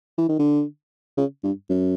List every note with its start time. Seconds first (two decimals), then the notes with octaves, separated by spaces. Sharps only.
0.18 E3
0.29 D#3
0.39 D3
1.17 C#3
1.44 G2
1.69 F#2